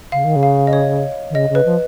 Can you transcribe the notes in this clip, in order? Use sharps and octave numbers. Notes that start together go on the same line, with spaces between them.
C#3 F5
D#3
C#3
F5
D#5
C#5
D#3
C#3 D#5
C#3
B4
F3